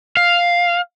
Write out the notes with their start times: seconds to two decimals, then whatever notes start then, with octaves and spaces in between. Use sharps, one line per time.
0.17 F5